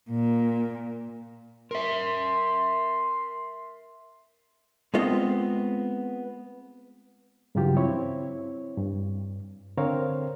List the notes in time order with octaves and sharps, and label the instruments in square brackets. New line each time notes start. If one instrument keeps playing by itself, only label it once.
[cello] A#2
[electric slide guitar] A#4 E5 [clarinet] C6
[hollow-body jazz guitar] G#3 A3 B3 C4 F4 D#5
[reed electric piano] G2 C#3 E3 F#3 F4 G4
C4 E4 C#5
G2
D3 C4 A#4 C5 C#5 F5